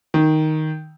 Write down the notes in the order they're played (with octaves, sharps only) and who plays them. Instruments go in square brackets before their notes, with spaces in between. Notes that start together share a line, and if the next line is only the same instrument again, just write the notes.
[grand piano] D#3